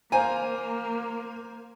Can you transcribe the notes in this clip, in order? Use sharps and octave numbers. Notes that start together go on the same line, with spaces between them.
A#3 C5 F5 G#5 A#5